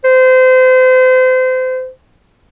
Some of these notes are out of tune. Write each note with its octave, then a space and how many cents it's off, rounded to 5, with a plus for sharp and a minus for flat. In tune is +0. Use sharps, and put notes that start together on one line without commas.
C5 -30